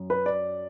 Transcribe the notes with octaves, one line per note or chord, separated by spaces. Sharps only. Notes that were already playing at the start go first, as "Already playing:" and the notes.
Already playing: F#2
B4
D5